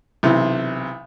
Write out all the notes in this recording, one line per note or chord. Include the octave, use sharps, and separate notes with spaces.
B1 C3 E3